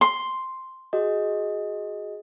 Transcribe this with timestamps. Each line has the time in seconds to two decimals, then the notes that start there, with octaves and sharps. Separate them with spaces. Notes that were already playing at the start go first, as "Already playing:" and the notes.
0.01 C6
0.93 F#4 G#4 D#5